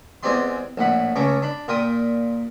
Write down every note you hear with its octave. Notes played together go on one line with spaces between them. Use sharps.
E2 G#3 C4 G4 D5 C6
A#1 A2 F#5 B5
C#2 C#3 A3 A#5 D6
D4 B5
A#2 F4 A#4 G5 D#6